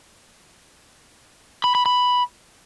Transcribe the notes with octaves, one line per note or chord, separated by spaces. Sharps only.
B5
B5
B5